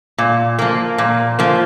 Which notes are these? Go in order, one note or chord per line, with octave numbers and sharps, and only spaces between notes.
A#2
F3 A#3
A#2
F3 A#3